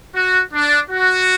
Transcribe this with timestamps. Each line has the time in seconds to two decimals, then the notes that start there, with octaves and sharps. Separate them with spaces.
0.15 F#4
0.53 D4
0.91 F#4